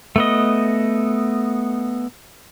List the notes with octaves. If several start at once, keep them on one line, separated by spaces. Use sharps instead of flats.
A3 B3 D#5